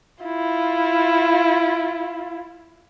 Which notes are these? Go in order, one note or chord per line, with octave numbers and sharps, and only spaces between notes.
E4 F4